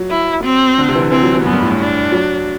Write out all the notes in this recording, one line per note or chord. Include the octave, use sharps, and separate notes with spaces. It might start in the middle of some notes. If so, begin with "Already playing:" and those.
Already playing: F#3
E4
C4
D3
C3
E3
D3
E3 C4
F#3
E3
F#2 B3
G2
A2
G2
D4
F#3